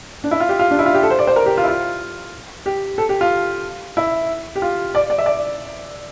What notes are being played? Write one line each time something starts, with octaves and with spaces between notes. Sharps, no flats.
D4
E4
F4
G4
F4
D4
E4
F4
G4
A4
C5
D5
C5
A#4
G4
F4
E4
F4
G4
A4
G4
F4
E4
G4
F4
D5
D5
E5
D5